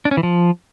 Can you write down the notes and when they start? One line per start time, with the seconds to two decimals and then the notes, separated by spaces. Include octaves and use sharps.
0.05 D4
0.11 C#4
0.17 E3
0.23 F3